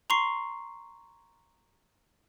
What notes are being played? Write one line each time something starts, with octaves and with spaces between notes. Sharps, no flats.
A#5 C6 C#6 C7